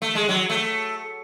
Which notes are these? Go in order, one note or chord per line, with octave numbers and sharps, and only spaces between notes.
A3
G#3
F#3
A3